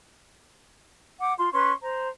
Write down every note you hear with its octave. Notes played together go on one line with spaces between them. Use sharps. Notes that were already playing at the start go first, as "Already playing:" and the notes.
F#5 D6
F4 C6
C#4 B4 C6 C#6
C5 A#5